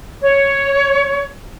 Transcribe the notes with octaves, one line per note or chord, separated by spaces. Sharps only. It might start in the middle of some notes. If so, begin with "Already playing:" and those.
C#5